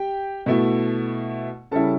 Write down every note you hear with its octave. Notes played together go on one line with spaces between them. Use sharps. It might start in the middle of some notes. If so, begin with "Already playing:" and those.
Already playing: G4 G5
B2 A3 E4
C#3 G3 C#4 E4 A4 A5